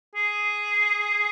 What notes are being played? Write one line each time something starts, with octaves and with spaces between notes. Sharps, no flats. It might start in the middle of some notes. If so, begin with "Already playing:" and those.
G#4